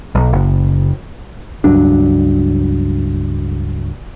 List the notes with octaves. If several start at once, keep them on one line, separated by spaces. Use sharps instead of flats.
B1
F#1
C#2 G2 F#3 D4